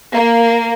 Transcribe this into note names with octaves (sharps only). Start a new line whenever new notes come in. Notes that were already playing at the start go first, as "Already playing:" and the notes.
A#3